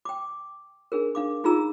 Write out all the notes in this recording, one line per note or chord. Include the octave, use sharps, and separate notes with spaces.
G5 D6
D4 G#4 A#4
D4 F5 D6
D#4 F4 G#4 A#5 E6